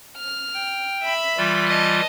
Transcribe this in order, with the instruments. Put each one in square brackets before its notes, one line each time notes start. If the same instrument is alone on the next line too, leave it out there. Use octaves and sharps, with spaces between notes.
[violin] F6
[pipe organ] G5
[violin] E5 B5
[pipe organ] E3 G3 F4
[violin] D#5 A5